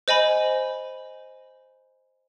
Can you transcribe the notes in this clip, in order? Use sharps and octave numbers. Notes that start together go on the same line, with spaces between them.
C5 D#5 G#5 B5